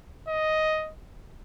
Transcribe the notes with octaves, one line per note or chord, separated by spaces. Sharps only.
D#5